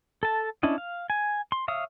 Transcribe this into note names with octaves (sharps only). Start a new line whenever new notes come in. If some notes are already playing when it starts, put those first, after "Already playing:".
A4 A5
C#4 D4 E4 D#5
F5
G#5
C6
C#5 E5 F5 D#6